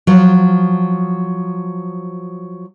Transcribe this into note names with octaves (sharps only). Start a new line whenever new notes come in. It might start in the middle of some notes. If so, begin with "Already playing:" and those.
F3 F#3